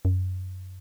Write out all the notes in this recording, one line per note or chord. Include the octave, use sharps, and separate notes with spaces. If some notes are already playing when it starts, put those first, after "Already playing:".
F#2